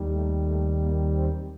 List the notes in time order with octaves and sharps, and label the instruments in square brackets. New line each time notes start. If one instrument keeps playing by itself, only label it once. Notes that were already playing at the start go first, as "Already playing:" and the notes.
Already playing: [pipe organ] D#2 D#3 G3
A3
A3
A#3
C4